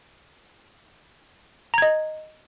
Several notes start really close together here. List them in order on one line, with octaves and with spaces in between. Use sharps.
A#5 G#6 D#5